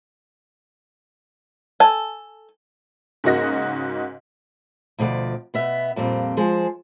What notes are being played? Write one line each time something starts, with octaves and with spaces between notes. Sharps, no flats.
A4 G#5
G#2 C#3 A#3 F#4 D#5 A#6
D2 B2 F3 G#4 D5
B2 B3 E5
F2 A#2 G3 C4
F3 G#3 G#4 C5